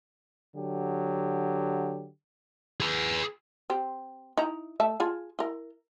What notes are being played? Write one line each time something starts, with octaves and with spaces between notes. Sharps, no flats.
D3 F#3 G4
G#4 B4
C4 G4
D#4 E4 A#5
A3 E5 A5
F4 G#4 A5
E4 A#4